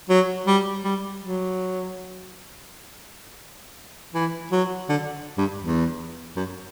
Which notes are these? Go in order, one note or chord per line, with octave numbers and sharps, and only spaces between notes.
F#3
G3
G3
F#3
E3
F#3
D3
G2
E2
F#2